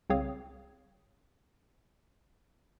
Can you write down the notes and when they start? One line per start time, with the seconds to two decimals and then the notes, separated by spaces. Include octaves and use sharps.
0.10 C2 C#3 C4 C#5 F5 D#6